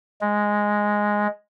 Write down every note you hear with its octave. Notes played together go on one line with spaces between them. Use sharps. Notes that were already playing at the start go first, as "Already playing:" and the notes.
G#3